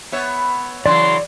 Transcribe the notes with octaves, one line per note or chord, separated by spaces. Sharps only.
B3 C#5 E5
C#3 E3 F#3 D5 C6